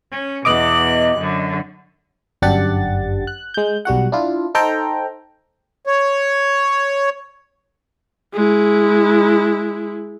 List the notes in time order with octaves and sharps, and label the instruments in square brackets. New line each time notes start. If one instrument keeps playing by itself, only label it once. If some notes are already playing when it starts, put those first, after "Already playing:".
[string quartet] C#4
[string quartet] E2 B2 F#6 [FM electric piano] D#5 D6
[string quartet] F#2 D3
[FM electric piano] G1 F#2 D4 G4 F#5 A6
F#6
G#3 G6
B1 G3 F#4 F#5
D4 E4 F4
D#4 A4 C5 G5 A#5
[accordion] C#5
[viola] G#3 E4